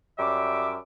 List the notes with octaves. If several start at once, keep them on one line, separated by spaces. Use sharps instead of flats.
F#2 F#3 G3 E5 D6